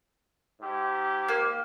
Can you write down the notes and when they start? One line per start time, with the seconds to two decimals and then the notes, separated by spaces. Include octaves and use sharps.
0.61 G#2 G4
1.28 A#3